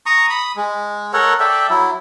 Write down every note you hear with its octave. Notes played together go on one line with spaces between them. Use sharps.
A#5 C#6 D#6
B5 D#6
G#3
A4 A#4 C#5 F#5
A4 D5 E5 G5
F#3 E4